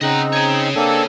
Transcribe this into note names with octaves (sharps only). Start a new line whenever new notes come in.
C#3 C4 D#4 D#5 F#5
G#4 C#5
A#3 C4 D4 A4